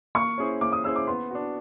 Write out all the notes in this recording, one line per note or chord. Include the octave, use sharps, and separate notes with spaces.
A#3 C#6
C#4 E4 G#4 C5
A#3 D6
D#6
C#4 E4 G#4 C5 E6
D6
B3 C6
D4 F#4